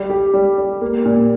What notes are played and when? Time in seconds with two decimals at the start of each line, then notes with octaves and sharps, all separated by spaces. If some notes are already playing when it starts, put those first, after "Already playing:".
Already playing: G3
0.10 G4
0.33 G3
0.58 G3
0.81 A#3
1.05 A#2